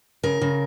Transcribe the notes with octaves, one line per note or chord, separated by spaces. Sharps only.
C#3 A#4
C#3